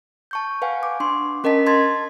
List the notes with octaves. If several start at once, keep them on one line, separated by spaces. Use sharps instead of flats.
A5 C#6 G6
B4 F5 F#5 G#5
D6
D4 C6 C#6
C#4 A#4 D#5 A5 B6
A5 C6 G#6 A6